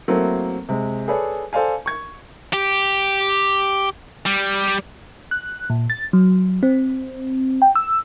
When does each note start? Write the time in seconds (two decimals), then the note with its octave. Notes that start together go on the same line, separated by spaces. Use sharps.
0.08 F#3 A3 A#3 C4 E4
0.69 C3 G#3
1.08 G#4 A4 B4 C#5 D5
1.53 A4 C5 D5 F5 G#5
1.86 C#6 G#6
2.53 G4
4.26 G3
5.31 F#6
5.70 A#2
5.90 A6
6.13 F#3
6.63 C4
7.62 G5
7.76 E6